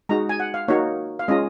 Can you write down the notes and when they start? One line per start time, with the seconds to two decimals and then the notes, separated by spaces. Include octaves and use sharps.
0.09 G#3 D#4 F#4 A#5
0.29 G#5
0.40 F#5
0.54 F5
0.68 A#3 D#4 F#4 C#5
1.19 F5
1.28 G#3 C#4 F4 D#5